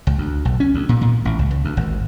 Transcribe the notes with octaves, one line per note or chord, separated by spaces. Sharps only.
C#2
D2
B1
C#4
D2
A#2
A#2
A1
C#2
C#2
D2
G#1